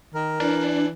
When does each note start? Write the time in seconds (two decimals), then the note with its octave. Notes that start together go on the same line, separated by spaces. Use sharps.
0.14 D#3 A#4
0.40 E3 D4